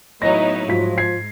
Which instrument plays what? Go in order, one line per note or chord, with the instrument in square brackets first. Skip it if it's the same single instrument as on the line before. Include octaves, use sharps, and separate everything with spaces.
[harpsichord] A2 F#3 [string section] B3 D#4 E4 [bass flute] D#5 [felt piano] A#6
[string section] G#2 [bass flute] F3 [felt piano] F4 F#4 B6
[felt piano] G#6 C7